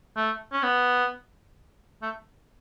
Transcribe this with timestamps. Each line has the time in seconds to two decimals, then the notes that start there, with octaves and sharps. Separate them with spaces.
0.16 A3
0.53 C#4
0.63 B3
2.02 A3